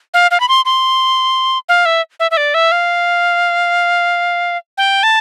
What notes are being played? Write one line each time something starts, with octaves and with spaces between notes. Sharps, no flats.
F5
F5
B5
C6
C6
F5
E5
E5
E5
D5
E5
F5
G5
A5